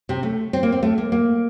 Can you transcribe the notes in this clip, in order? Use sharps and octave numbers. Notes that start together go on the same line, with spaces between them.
C3
A3
C4
A#3
C4
A3
A#3
A#3